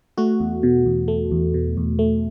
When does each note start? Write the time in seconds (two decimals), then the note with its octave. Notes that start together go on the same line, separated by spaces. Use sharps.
0.18 A3 F#4
0.40 E2
0.63 B2
0.86 E2
1.08 A3
1.31 E2
1.54 B2
1.77 E2
1.99 A3